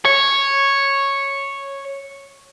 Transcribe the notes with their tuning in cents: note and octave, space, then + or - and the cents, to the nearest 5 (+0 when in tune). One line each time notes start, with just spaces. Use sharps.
C#5 -5